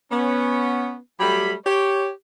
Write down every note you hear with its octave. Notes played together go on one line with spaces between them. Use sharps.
B3 C#4
F#3 G3 A3 G4 B5
G4 C#5